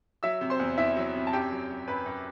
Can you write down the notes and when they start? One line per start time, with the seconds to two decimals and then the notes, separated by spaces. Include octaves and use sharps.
0.23 F#3 E5 E6
0.41 C3
0.50 C5 C6
0.59 E2
0.78 E2 E4 E5
0.96 F#3
1.15 C3
1.27 A5
1.33 F#2 G4 G5
1.51 F#3
1.70 F#3
1.88 F#2 B4 B5
2.06 F#2